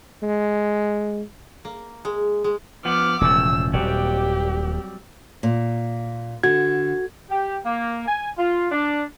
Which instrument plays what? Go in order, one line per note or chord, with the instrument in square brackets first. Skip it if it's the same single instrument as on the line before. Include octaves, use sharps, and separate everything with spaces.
[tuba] G#3
[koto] A#3
G#3
G#3
[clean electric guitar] F3 B3 [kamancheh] D6 F6
[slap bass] E1 [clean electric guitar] A2 C#3 F3 [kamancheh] E6
[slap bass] D#1 A#2 [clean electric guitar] F#3 G3 C4 [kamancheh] G4
[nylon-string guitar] A#2
[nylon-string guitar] D3 [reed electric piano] F#4 G#6
[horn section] G4
A#3
G#5
F4
D4